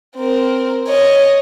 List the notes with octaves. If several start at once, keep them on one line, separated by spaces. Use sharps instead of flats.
C4 A#4
C#5 D#5